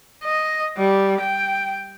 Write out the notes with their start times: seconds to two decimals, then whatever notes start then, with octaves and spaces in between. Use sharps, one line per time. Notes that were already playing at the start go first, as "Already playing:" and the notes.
0.24 D#5
0.77 G3
1.21 G5